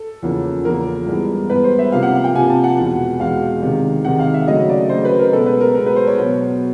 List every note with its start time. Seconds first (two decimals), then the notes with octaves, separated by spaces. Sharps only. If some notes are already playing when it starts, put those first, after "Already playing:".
Already playing: A4
0.22 E2 C#3 F3 A#3
0.65 E2 C#3 F3 A#3 A#4
1.07 G2 E3 G#3 B3
1.49 G2 E3 G#3 B3 B4
1.64 C5
1.79 E5
1.92 C3 F3 A#3 F5
2.03 F#5
2.13 F5
2.24 G5
2.35 C3 F3 A#3 G#5
2.50 A5
2.64 F#5
2.77 E2 B2 G#3
3.20 E2 B2 G#3 F5
3.62 C3 D#3 G#3
4.04 C3 D#3 G#3 F#5
4.19 F5
4.34 E5
4.47 C#3 F#3 A3 D#5
4.69 D5
4.89 C#3 F#3 A3 C5
5.05 B4
5.19 A#4
5.32 B2 G#3 B3 A4
5.46 B4
5.61 A#4
5.74 B2 G#3 B3 A#4
5.86 B4
5.96 C5
6.07 C#5
6.18 B2 F#3 B3